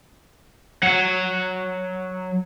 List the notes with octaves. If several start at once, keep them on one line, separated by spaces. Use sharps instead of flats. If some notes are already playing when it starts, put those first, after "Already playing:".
F#3 F#5